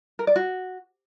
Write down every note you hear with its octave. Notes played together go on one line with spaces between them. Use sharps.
A#4
D5
F#4